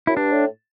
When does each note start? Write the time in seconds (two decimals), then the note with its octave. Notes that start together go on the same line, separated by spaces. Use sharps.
0.07 F#2 E4
0.16 G2 D4
0.32 A2